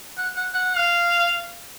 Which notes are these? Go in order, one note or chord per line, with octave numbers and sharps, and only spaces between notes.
F#5
F#5
F#5
F5